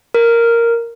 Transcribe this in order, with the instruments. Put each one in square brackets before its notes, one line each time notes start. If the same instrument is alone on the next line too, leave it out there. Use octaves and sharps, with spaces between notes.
[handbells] A#4